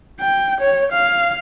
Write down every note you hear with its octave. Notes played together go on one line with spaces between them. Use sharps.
G5
C#5
F5